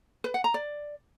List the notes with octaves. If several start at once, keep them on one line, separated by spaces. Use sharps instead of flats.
B4
F#5
A#5
D5